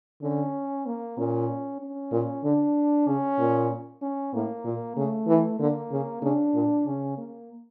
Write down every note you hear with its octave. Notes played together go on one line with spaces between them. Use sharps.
D3 C#4
A#3
A#2 C#4
C#4
A#2
D3 D4
C#3 C#4
A#2
C#4
A2 A#3
A#2
C#3 A3
E3
D3 A#3
C#3
C#3 D4
A#2
C#3 C#4
A#3